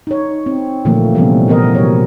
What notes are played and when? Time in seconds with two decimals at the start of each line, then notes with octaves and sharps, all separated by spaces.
0.07 D#4 C#5
0.46 C4
0.85 A#2 D3 E3 F3 A3 A#3
1.15 C3 E3 F3 G3 B3 C#4
1.48 A#2 E3 B3 A#4 D#5
1.75 C3 F#3 C#5